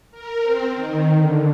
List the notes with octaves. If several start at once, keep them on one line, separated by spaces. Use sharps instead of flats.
A#4
C4
D#3
D3